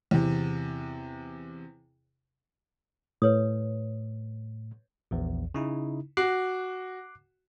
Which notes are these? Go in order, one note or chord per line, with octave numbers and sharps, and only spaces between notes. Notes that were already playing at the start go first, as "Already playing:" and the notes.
E2 C3
A2 B4 C#5 D#6
A#1 E2
C#3 D#4 E4
F#4 D6 F#6 C7